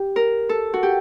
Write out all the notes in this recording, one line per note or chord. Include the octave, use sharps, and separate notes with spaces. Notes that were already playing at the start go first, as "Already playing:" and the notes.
Already playing: G4
A#4
A4
F#4
G4